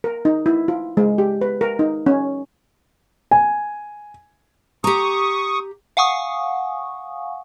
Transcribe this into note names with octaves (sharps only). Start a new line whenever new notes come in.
A#4
D#4
E4
F4
G#3
G4
B4
A#4
D#4
C#4
G#5
G4 A#5 C#6 D#6
F5 F#5 G#5 C#6 D#6